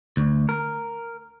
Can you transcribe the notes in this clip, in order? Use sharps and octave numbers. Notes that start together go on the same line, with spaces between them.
D2
A#4